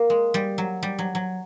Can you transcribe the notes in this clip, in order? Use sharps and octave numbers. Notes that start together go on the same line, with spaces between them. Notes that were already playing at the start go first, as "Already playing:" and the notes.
Already playing: A#3
G#3
G3
F#3
G3
F#3
F#3